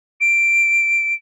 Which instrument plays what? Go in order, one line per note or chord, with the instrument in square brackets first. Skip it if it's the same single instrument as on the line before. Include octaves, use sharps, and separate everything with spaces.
[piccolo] D7